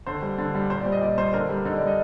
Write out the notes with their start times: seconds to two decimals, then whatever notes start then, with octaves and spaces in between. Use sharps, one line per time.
0.06 D3 C5
0.22 G3
0.38 D3
0.55 G3
0.70 A#2 C5
0.81 D5
0.86 G3
0.92 D#5
1.02 A#2 D5
1.17 G3 C5
1.33 D3 A#4
1.49 G3
1.65 D3 D#4
1.76 D5
1.81 G3
1.87 D#5